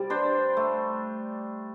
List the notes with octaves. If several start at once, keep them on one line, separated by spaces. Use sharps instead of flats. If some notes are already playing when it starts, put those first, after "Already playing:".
Already playing: C3 G3 D5
D4 C5
A3